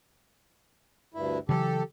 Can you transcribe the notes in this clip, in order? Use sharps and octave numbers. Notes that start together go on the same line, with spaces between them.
D2 G2 E4
C#3 E3 F#3 G4 A4